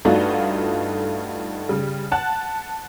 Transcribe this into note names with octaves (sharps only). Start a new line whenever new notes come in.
G2 A3 D4 D#4 F4 F#4
C#3 G3
F#5 A5 F#6